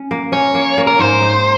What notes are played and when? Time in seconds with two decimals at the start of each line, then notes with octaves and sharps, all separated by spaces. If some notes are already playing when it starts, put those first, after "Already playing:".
Already playing: C#4
0.11 A#3
0.32 C#4 C#5
0.55 A#3
0.78 A#3
0.87 A#4
0.99 G#2 C5
1.22 D#4